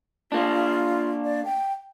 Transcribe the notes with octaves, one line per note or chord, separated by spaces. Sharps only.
A#3 D4 F4
D5
G5